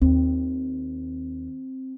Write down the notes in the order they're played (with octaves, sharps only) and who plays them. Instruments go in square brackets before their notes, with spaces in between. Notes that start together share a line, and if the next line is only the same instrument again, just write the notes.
[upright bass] D#2 [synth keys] C4